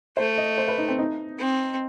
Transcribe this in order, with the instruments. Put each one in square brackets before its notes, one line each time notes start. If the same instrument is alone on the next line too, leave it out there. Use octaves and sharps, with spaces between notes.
[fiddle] A3 [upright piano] C5
[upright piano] D#5
C5
B4
D#4
C4
D#4
[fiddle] C4